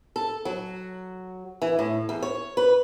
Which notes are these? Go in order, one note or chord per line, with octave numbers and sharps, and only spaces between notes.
A4
F#3
E3
A2
E2
C#5
B4